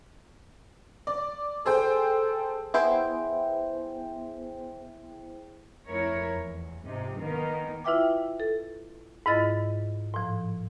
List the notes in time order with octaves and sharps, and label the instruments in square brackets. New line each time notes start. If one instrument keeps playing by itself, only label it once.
[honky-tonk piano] D5
[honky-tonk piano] G#4 C5 G5 [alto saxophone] A4
[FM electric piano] B3 E4 G#4 C5 G5
[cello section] F2 A3 E4 A#4 C#5
E2
G#2 C3 F3 D#4
D#3 A#3 B3 D#4 A#4
[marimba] E4 F4 B4 E5 G5 D6
A4
G#2 E4 F4 D#5 A6
A2 F3